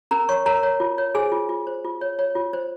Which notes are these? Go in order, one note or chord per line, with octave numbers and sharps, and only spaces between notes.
C#4 A#4 A#5
C#5 C#6
A#4 C#5 A#5
C#5
F4
C#5
G#4 C5 G#5
F4
F4
C5
F4
C#5
C#5
F4
C5